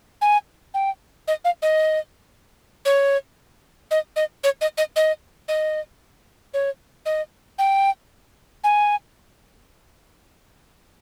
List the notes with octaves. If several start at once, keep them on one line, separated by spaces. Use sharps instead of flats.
G#5
G5
D#5
F5
D#5
C#5
D#5
D#5
C#5
D#5
D#5
D#5
D#5
C#5
D#5
G5
G#5